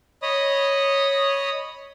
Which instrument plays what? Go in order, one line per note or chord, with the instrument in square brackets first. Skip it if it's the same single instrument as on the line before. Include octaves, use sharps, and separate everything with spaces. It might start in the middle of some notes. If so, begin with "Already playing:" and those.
[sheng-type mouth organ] C#5 D#5 B5 D#6